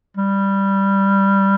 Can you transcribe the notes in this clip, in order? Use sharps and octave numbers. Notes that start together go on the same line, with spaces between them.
G3